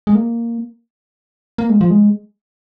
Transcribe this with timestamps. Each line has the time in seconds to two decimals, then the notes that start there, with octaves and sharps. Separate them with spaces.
0.07 G#3
0.15 A#3
1.58 A#3
1.70 G#3
1.81 F3
1.90 G#3